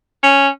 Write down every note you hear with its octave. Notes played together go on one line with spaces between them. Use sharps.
C#4